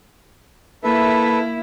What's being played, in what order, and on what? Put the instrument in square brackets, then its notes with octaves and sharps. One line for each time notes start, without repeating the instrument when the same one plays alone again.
[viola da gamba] A#3 E4 [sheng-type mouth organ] A4 B4 E5